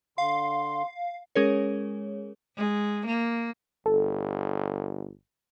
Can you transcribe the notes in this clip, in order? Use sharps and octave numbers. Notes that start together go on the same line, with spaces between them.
D3 F5 C6
G#3 C#4 G#4 A#4 C#5
G#3
A#3
G1 A4